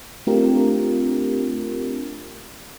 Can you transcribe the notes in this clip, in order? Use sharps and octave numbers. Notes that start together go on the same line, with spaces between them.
A3 C4 D4 F4 G4 A#4